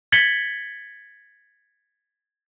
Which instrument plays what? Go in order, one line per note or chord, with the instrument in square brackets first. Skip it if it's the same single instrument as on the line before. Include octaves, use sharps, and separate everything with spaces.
[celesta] G#6 A6 B6 C#7 F#7 G7